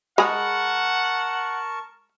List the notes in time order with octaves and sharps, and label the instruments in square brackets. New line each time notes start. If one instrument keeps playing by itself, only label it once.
[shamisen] G#3 G#4 [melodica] A#4 A5 C#6 [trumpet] F#5 [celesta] B5